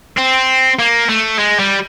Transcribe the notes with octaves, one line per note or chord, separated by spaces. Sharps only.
C4
A#3
A3
G#3
G3